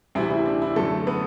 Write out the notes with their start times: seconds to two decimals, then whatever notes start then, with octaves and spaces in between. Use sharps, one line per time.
0.15 D2 C3 E3 E4
0.30 E4
0.46 D4
0.62 E4
0.76 F#2 D3 A3 A4
1.07 B3 B4